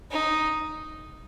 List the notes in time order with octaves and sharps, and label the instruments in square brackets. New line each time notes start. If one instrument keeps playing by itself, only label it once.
[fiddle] D#4